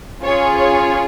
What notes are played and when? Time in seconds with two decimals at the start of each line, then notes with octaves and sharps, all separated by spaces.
0.24 C#4 F4 G#4 C#5
0.57 C#5